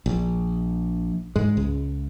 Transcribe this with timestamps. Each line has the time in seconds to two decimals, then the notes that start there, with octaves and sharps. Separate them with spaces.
0.06 A#1
1.36 G#2 G#3
1.57 C#2